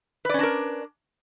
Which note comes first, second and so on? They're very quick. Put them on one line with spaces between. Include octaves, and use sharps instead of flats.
B4 D5 C#4 D4 A#4